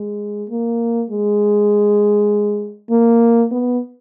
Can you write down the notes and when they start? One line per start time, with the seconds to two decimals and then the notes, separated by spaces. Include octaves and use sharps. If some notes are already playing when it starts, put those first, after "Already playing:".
Already playing: G#3
0.50 A#3
1.10 G#3
2.91 A#3
3.52 B3